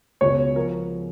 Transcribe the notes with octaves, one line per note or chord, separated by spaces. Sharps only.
C#2 B2 C#5
F3 A#4